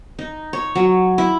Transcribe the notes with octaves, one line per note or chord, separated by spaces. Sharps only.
D#4
C#5
F#3
E4